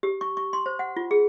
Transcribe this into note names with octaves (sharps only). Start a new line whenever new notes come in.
G4
C#6
C#6
C6
C5
F#5
F4
G#4